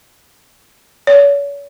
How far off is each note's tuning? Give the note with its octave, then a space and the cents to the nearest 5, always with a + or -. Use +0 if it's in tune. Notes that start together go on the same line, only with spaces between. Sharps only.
C#5 +40